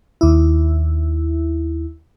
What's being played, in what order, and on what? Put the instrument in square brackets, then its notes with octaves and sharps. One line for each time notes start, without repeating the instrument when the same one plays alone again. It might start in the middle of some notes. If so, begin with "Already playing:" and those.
[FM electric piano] D#2 E4